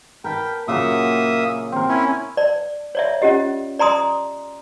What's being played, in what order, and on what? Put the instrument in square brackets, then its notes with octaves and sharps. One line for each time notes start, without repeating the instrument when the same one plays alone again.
[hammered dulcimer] A#4 B4 A5 [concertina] G5
[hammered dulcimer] A#2 C#3 F#3 [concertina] A#3 E5 D#6
[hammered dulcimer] C4 A#4
[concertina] C#4 E4 C#5
[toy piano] D5
C#5 D5 E5
C#4 F4 G4 D#5
D5 A#5 C6 D#6